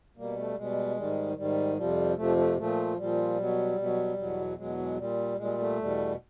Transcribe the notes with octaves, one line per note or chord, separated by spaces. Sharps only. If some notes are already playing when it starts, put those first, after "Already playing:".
B2 G3 A#3
A3
B2 G3 G#3
G#2 D#3 G3
G#2 D#3 G3
F2 C3 F3 G3
F2 C3 F3 A3
A3
A#2 F3 A3
A#2 F3 G3
B2 F#3
B2 F#3
E2 B2 F#3
E2 B2 F#3 G#3
G#3
A#2 G3
A#2 G3 G#3
A3
E2 B2 G3